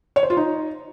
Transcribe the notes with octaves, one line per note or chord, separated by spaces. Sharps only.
C#5
C5
F4
D#4